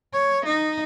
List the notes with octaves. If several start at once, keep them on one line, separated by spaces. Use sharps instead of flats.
C#5
D#4